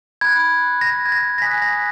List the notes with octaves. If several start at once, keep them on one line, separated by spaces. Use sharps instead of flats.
B5 F#6 G#6
A#6
G#6
A#6
A#6
G#5 D#6 F#6 B6
A#6